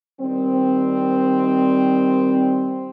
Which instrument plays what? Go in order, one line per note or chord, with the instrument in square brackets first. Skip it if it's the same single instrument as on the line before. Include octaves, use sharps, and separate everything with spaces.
[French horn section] D#3 G3 C4